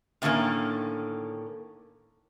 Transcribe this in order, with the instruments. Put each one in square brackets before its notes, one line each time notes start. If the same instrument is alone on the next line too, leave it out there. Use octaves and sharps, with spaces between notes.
[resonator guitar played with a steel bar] A2 D3 D#3 G3 A#3 C#4